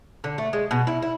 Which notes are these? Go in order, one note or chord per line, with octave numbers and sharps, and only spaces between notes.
D3
A3
G#3
B2
E4
E4